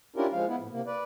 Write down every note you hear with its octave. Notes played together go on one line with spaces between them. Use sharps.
C#4 D4 E4 F4 G4 A#4
F3 G#3 F5
B3 E4
A2
C3 A#3
B4 D5